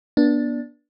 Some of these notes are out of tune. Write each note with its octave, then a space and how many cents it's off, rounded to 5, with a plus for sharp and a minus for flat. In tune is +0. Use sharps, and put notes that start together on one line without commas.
B3 -35 D4 +0